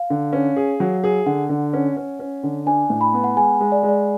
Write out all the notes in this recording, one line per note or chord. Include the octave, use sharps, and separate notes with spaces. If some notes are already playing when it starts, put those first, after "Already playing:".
Already playing: F5
D3
C#4
G#4
F#3
G#4
D3 F#5
D3
C#4
C#4
C#4
D3
D4 G#5
A2
B5
B3
F#5
G#3 G#5
G#3
D5
G#3
D5